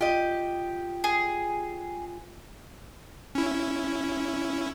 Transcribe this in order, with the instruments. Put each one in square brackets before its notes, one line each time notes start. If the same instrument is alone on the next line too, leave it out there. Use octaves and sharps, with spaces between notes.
[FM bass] F4 [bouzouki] G4 D#5
[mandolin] G#4
[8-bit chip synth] C#4 E4